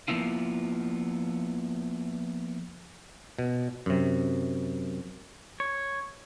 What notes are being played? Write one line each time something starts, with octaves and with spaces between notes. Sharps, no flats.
F3 A#3 B3 E4 F4
B2
F#2 C3
C#5